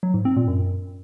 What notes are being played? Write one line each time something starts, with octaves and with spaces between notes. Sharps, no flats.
F#3
G#2
C4
A#2
F#2